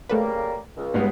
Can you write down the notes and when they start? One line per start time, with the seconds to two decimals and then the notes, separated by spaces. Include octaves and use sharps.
0.09 C#3 G3 A3 A#3 A4 B4
0.77 C#2
0.94 G#2 G3 G#3 B3